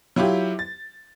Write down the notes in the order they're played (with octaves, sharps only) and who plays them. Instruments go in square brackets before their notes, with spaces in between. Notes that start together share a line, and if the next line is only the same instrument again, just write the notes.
[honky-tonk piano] F#3 E4 F4 G4
A6